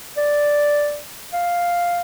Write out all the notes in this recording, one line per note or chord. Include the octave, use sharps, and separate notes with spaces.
D5
F5